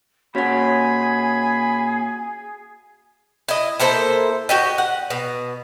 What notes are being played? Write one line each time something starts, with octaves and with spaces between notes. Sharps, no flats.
A#2 C#4 F#4 G#4 F#5 B5
E4 D#5
A#3 E4 A4 C5
F#4 G4 D#5
F#5
B2